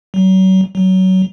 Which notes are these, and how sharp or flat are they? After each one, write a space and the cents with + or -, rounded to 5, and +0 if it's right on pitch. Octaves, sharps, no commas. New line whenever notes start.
F#3 +35
F#3 +20